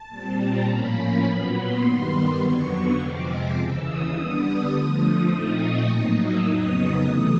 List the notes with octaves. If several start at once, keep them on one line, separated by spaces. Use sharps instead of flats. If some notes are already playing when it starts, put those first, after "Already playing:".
Already playing: A5
A#2 G3 C4
A#5
A2 F3 A#3 C#4 B5
B5
A#2 F#3 B3
C6
G2 D#3 G3 B3
F2 D3 F#3 B3 C#6
F2 C3 F3 G#3 C4 D6
D6
D#2 C#3 E3 E6
D#6
D3 G3 B3 D4
D3 F3 A3 D#6
A#2 F3 A3 C4 D#4 D#6
C#6
A2 F#3 A#3 D#4 D#6
E6
F2 C#3 F#3 B3 D#4 D#6
C3 E3 A3